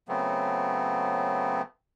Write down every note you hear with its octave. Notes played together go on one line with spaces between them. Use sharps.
C#3 F#3 A3 B3 C4